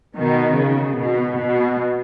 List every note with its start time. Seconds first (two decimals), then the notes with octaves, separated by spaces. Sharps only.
0.16 B2 D#3
0.55 C#3
0.96 B2
1.36 B2